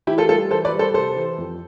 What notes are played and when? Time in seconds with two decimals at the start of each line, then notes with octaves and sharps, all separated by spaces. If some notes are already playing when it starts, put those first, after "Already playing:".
0.07 E3 E4 G4
0.18 F4 A4
0.29 G3 F4 A4
0.50 E3 A4 C5
0.65 B4 D5
0.72 G3
0.79 A4 C5
0.94 C3 A4 C5
1.16 E3
1.38 F2